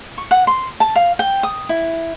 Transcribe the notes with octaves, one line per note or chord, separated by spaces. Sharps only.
C#6
F#5
C6
A5
F5
G5
D#6
E4